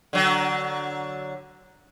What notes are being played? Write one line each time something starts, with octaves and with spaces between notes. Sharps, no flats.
D3 F#3